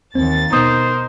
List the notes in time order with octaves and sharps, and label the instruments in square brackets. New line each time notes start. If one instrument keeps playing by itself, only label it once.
[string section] D#2 A6 [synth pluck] C4
[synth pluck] B2 B3 [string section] D#4 A#4 [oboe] C5 [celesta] D#6